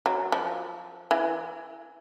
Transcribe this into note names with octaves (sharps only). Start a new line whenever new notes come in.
F#3
F3
E3